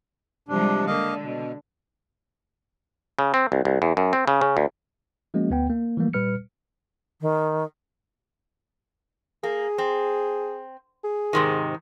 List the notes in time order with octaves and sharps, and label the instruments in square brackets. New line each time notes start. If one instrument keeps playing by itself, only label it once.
[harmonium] C3 D4 [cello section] F3 G3 G#3
[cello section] D3 [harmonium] A#3 D#5 F5
[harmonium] B2
[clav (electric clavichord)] C#3
C4
C2
C2
E2
F#2
C4
C#3
C#3
D2
[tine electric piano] F3 G#3 A#3 C#4 F#4 D#5
D2 B3 G5
A#3
E3 F3 G3 A3 A#3
A#2 G3 B4 F6 C#7
[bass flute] D#3
[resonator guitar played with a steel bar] A#3 [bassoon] G#4
[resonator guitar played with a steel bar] C4
[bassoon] G#4
[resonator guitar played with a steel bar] G#2 C3 D#3